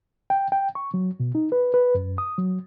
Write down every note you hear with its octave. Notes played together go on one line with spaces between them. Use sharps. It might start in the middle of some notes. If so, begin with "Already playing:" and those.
G5
G5
C#6
F#3
B2
D#4
B4
B4
F#2
D#6
F#3